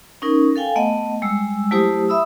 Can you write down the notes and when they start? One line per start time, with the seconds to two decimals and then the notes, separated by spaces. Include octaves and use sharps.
0.22 C#4 D#4 A#4
0.56 A4 F5 G5 G#5
0.76 A3 B3 D#5 F#5
1.22 G3 G#3 E6
1.71 F#3 A3 E4 G4 C5 D#6
2.09 E5 B5 D#6 E6